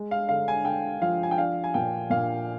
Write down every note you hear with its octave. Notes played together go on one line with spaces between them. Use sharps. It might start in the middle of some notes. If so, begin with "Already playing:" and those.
Already playing: G#3
F5
D3 F5
G#5
D3 G5
F3 F5
G#5
G5
D4 F5
G#5
A#2 G5
A#2 F5